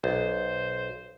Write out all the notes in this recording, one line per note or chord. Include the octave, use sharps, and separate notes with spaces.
B1 C5